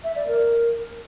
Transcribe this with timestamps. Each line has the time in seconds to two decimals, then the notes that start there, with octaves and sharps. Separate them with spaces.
0.04 E5
0.16 D5
0.28 A#4